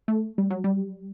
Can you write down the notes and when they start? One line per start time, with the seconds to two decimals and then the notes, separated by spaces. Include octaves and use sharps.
0.08 A3
0.38 G3
0.51 F#3
0.64 G3